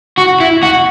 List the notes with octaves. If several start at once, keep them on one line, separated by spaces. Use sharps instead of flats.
F#4
E4
F#4